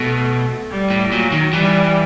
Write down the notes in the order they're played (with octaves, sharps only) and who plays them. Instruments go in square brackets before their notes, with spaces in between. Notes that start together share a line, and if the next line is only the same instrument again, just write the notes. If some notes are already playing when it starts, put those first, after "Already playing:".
Already playing: [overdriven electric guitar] B2 [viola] A3
[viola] G3
[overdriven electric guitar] A2
[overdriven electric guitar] A#2 [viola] F#3
[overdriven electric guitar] D#3
[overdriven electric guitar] E3 [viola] G3